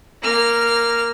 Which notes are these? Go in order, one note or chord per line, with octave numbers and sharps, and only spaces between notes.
A#3 F6